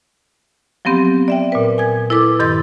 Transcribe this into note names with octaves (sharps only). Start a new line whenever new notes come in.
F3 F#3 B3 C4 G4
D5 E5 G5
A#2 B4
G#5 D#6 G#6
E4 A4 B4 D6
G2 D#3 C6 E6 G6 A6